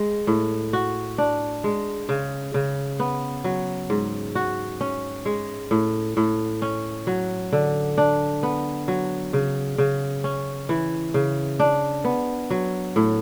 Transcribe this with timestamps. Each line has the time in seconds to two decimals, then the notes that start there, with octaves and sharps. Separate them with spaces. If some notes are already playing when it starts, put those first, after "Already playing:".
Already playing: G#3
0.27 A2
0.73 F#4
1.18 D4
1.64 G#3
2.09 C#3
2.54 C#3
3.00 B3
3.44 F#3
3.90 G#2
4.35 F#4
4.81 C#4
5.25 G#3
5.71 A2
6.17 A2
6.62 C#4
7.07 F#3
7.53 D3
7.98 D4
8.43 B3
8.88 F#3
9.33 C#3
9.78 C#3
10.24 C#4
10.69 E3
11.14 C#3
11.59 D4
12.04 B3
12.50 F#3
12.96 A2